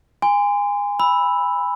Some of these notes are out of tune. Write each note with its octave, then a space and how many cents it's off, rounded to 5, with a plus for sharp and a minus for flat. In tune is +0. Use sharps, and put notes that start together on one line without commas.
G#5 -25 C6 -30
B5 +0 E6 +0